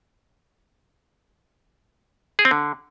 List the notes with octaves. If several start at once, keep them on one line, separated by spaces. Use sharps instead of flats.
G#4
C4
D3